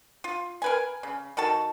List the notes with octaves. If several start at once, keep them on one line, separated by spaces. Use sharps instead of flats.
F4
A#4 B4 G#5
C#3
D#3 F#4 A4 A5